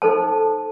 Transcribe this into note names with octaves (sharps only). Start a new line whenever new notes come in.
D#4 A4 C5 A5